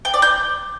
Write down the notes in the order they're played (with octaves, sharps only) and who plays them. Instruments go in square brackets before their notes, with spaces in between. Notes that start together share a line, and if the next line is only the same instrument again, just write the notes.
[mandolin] G5
D5
G6